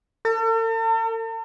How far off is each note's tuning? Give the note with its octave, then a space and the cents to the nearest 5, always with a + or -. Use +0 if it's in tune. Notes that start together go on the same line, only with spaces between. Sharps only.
A4 +45